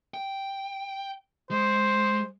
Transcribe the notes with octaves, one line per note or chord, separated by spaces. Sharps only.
G5
G#3 C5